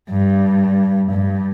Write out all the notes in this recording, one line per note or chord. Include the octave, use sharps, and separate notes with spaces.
G2
G2